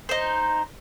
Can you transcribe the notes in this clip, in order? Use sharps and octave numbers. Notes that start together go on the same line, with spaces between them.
D#4 C5